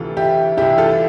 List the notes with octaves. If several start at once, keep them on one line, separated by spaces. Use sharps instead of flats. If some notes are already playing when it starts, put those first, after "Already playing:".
Already playing: D2 C3 E3 F4 A4
E4 G4
C2 C3 E3 E4 G4
F4 A4